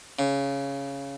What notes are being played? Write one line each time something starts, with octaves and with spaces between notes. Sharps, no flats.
C#3